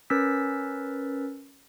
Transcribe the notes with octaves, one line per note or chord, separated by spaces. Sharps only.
C#4 A#4 B4 E6 A6 B6